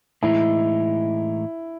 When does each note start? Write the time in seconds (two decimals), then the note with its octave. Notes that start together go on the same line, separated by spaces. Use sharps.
0.22 A2 E3 G#3 D#4 E4